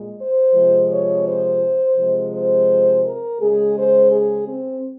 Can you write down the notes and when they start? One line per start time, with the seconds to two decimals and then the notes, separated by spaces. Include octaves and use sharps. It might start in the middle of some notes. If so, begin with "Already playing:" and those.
Already playing: A#2 G#3
0.19 C5
0.54 C3 F3 G#3
0.89 C#5
1.25 C5
1.96 C3 F3 G#3
2.32 C5
3.04 A#4
3.39 C#3 G#3 G#4
3.75 C5
4.10 G#4
4.46 C4